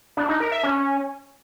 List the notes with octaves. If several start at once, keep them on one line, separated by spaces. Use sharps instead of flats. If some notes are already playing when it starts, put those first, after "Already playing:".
D4
D#4
A#4
E5
C#4